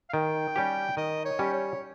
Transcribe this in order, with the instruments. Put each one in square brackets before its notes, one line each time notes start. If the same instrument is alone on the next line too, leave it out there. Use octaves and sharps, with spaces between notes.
[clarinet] F5
[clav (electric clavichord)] D#3 [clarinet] G5
[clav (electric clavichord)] G3 C#4 G4
[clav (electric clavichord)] D#3 [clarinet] D#5
[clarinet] C#5
[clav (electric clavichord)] G3 C#4 G4
[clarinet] C#5